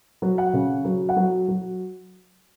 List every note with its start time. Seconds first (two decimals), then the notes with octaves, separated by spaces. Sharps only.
0.22 F#3
0.38 F#5
0.54 C#3
0.85 F#3
1.09 F#5
1.16 F#3
1.48 F#3